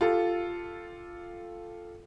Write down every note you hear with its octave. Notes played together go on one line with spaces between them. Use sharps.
F4 G4 A4